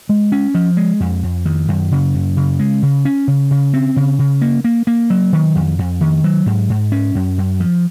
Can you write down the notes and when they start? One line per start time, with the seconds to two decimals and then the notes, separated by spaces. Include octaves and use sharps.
0.09 G#3
0.32 C#4
0.55 F3
0.77 G#3
1.00 F2
1.23 F2
1.46 D#3
1.68 F#2
1.91 C#3
2.14 F#2
2.37 C#3
2.59 G#3
2.82 C#3
3.05 C#4
3.28 C#3
3.51 C#3
3.74 C4
3.96 C#3
4.19 C#3
4.41 A#3
4.64 A#3
4.87 A#3
5.10 F#3
5.33 D#3
5.55 F2
5.79 F2
6.01 D#3
6.24 F#3
6.46 G#2
6.69 G#2
6.92 C#4
7.15 F#2
7.37 F#2
7.60 F3